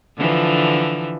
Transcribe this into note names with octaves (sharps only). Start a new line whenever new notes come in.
D3 E3 F3